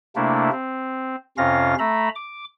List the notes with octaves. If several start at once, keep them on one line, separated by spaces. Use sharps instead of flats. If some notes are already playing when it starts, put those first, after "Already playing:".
C3 A3 A#3 D4 E4
C4
F2 C3 C#4 F4 F5 A#6
A3 E5 A#5 B5
D6